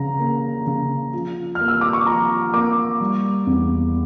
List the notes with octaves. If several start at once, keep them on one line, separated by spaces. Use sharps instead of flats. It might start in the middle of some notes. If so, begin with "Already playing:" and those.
Already playing: C#3 A#5
A#3
C#3
F3
A#3 F6
E6
D6
C#6
F3 A#5
A#3 D6
G3
E2